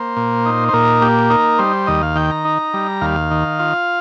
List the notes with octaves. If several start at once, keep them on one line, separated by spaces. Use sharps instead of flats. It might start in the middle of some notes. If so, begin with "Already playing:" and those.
Already playing: A#3 C5
A#2
D#4
C5
A#2 A#4
A#3 G4
D#4 A#4
G3 C5
D#2 D#5
F5
D#3 G5
A#5
D#4
G3
D#2 F5
D#3
F4